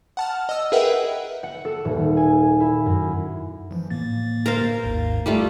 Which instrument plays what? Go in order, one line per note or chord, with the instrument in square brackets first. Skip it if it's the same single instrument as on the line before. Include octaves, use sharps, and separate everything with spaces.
[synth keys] F#5 A5 F6
D#5 E6
G#4 A#4 B4 E5 F#5 G5
[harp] F#5
A4
D#1
G#5
E4
F#2
[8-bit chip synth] E3 F3
A2 A#3 A6
[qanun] A#4 C5 F5
[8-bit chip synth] G#1 D#2 G#2
[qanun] G3 A3 F4 [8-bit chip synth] D6